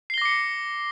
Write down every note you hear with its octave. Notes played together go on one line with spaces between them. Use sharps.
D6 A#6 C7 C#7 G7